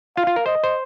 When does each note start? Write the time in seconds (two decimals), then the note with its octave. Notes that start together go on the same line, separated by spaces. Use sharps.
0.17 F4 F5
0.27 F4
0.36 A#4
0.46 C5 D#5
0.64 C5